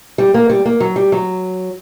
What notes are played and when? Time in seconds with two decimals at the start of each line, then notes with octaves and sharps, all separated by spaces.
0.18 G3
0.34 A#3
0.50 G3
0.65 A#3
0.80 F#3
0.96 G3
1.12 F#3